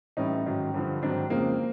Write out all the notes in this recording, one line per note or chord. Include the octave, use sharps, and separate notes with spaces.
A2 E3 G3 C#4 D#4
G#2 D#3 F#3
G2 D3 F3
G#2 D#3 F#3 C4 D4
F2 C#3 F3 G#3 A#3 C4